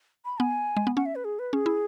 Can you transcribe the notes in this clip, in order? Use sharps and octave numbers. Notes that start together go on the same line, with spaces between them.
B5
B3 G#5
G#3
B3
C#4 F#5
E5
B4
G#4
B4
C#4 G#4
E4